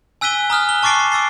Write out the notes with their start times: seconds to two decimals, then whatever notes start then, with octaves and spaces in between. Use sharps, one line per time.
0.21 G#5 E6 F#6 B6 D#7 G7
0.50 A#5 D#6 F6 F#6
0.69 G7
0.83 A5 C#6 D6 A6 C7 D7
1.12 D6 E6 A6 C7